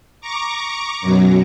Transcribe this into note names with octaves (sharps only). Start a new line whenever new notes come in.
A#5 C#6 D6
F#2 B2 F#3